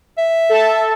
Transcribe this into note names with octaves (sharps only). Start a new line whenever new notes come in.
E5
A4 A5